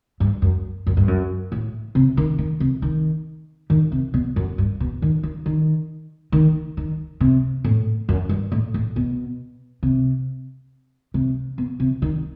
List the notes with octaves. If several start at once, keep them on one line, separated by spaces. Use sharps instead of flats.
G2
F#2
F#2
G2
F#2
A2
C3
D#3
D#3
C3
D#3
D#3
C3
B2
F#2
G2
B2
D#3
D#3
D#3
D#3
D#3
C3
A2
F#2
G2
A2
A2
B2
C3
C3
B2
C3
D#3